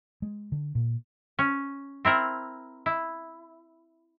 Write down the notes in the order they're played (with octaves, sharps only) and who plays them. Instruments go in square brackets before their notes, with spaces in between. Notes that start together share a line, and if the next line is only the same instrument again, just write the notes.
[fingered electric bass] G#3
D3
A#2
[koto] C#4
C4 E4 A#4
E4